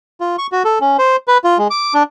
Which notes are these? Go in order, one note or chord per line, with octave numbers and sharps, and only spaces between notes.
F4
C#6
F#4
A4
C#4
C5
B4
F4
G#3
D6
D4